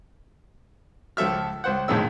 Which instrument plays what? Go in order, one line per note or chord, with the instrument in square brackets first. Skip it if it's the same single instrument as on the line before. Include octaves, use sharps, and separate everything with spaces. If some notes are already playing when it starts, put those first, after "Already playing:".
[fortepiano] C#2 F3 A4 E5 F6
C#2 C5 F#5
A#1 F2 A2 D#3 G#3 E6